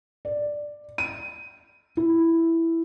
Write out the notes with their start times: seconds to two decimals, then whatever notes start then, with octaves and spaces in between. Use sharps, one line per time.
0.25 D5
0.98 D#7
1.97 E4